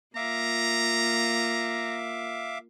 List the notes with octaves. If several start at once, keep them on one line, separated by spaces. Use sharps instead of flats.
A#3 F4 E5 F5 A#5 D6